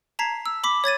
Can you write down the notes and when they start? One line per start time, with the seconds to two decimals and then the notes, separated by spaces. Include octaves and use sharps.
0.19 A5 A#5 G#6 B6 C7
0.46 E6
0.64 B5 D6 B6
0.84 C#5 G#6 A6 D#7